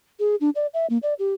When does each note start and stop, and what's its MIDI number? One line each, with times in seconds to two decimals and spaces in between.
0.20 0.36 68
0.41 0.50 62
0.56 0.67 74
0.74 0.86 76
0.90 0.98 58
1.03 1.14 74
1.19 1.34 67